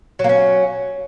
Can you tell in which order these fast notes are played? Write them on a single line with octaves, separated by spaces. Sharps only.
F#3 A#3 C#4